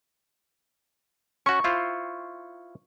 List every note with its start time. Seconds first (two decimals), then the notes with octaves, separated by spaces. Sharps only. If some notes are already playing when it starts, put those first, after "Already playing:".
1.46 C#4 F#4 C#6
1.64 E4 F4 C5